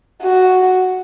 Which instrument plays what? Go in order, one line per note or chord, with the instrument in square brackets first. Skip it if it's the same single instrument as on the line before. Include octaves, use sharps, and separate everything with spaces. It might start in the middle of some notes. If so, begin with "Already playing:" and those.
[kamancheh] F#4